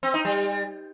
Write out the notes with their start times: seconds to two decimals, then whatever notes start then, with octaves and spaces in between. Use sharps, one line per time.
0.03 C4
0.14 D#4
0.25 G3